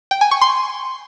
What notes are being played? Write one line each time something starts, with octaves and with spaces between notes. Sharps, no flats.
G5
G#5
C#6
C6